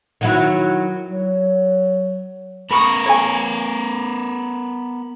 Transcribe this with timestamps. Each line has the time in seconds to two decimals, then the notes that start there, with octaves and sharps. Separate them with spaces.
0.21 D#3 F#3 E4
1.05 F#3
2.71 B3 A#4 B5 C#6 D#6
3.06 C#5 G#5